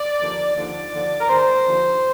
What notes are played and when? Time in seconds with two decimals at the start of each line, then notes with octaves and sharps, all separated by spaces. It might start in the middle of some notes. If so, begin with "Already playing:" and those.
Already playing: D5
0.20 D#2 D3 F3
0.56 D#2 D3 F3 D5
0.93 D#2 D3 F3
1.20 A#4
1.29 G#2 D#3 C5
1.66 D#2 D3 F3